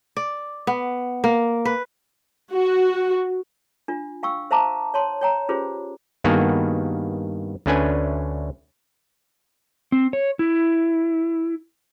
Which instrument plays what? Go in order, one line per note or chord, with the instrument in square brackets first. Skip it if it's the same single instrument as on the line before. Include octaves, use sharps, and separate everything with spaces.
[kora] D5
B3
A#3
B4
[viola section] F#4
[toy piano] D4 F4
F5 G5 C#6 E6
C5 E5 F5 A5 A#5 D6
C#5 A5 C6
C#5 G5 A#5
C#4 F4 G4 G#4 B4 C5
[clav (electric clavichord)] G2 D#3 A#3 B3 F#4 G#4
D2 A3 C#4 D4 B4 G#5
[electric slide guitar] C4
C#5
E4